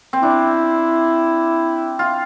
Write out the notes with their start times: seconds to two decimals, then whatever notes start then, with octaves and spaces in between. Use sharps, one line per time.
0.13 C4
0.23 D4 E4
1.99 F4